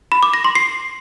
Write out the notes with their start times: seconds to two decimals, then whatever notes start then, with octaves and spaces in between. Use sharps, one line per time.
0.12 B5
0.23 D6
0.34 A#6
0.44 C6
0.55 C7